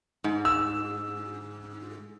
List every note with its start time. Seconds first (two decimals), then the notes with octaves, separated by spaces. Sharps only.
0.24 G#2
0.45 E6